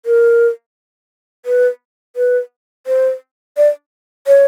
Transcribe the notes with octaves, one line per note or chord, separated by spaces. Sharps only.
A#4
B4
B4
C5
D5
C#5